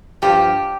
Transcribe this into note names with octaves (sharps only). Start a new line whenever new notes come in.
G2 F3 G4